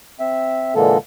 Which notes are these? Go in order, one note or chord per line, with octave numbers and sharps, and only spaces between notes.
C4 E5
A#2 D3 E3 G#3 A#3 A4